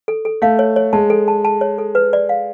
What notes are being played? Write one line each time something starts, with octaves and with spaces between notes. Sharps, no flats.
A4
A4
A3 F5
C#5
C#5
G#3 A5
A4
A5
A5
C#5
A4
B4
D5
F5